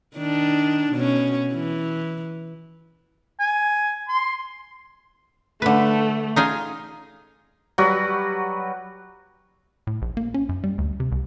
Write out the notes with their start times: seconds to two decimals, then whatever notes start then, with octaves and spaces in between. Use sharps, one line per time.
0.16 D#3 D4
0.92 B2 C#4
1.53 E3
3.40 G#5
4.09 C6
5.62 D3 A3 B4
6.36 D#4 F4 G#4
7.78 F#3 G3 F#4 B4
9.87 A2
10.02 A#1
10.17 A#3
10.34 C#4
10.49 F#2
10.64 G3
10.78 D2
11.00 C3
11.12 C2